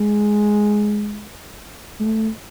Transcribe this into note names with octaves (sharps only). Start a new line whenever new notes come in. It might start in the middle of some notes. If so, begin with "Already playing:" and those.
Already playing: G#3
A3